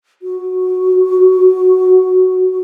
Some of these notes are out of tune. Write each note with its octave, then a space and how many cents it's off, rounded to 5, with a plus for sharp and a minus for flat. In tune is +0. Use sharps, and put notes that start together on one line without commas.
F#4 +0